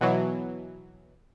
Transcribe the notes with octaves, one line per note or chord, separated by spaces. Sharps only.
B2 E3 F#3